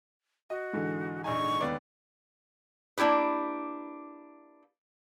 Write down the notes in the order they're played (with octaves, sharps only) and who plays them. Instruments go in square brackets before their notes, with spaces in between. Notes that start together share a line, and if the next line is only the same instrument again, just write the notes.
[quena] F#4 [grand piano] D#5
[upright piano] G#2 D3 E3
[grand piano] A#1 D#4 G#5 [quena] C#6
[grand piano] D#2 B3 D5
[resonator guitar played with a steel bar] A#3 D4 E4 G4 B4